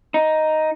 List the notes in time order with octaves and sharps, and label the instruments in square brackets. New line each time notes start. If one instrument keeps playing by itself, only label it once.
[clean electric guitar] D#4